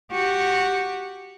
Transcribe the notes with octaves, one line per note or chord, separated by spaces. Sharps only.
F#4 G4